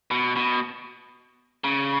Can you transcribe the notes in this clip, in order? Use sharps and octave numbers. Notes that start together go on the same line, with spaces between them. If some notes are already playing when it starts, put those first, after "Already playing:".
B2
B2
C#3